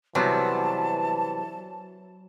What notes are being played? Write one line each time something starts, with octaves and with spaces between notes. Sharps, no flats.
C3 E3 F#3 G3 B3 A5